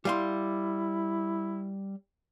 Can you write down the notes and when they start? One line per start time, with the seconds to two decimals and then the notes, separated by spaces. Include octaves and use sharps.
0.05 G3 E4 F5 C6